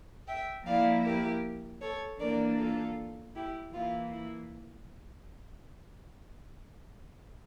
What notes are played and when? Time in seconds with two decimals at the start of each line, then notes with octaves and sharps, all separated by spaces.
0.27 E5 G5
0.65 F3 A#3 E4 D5 F5
1.05 G4 A#4
1.82 A4 C#5
2.20 E3 A#3 D4 A#4 D5
2.58 F4 A4
3.35 E4 G4
3.73 E3 A#3 E4 F4
4.13 E4